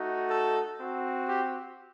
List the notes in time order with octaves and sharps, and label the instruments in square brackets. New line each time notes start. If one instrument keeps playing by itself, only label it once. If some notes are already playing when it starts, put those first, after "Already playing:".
Already playing: [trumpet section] A3 D#4 F#4
A4
C4 F#4
G4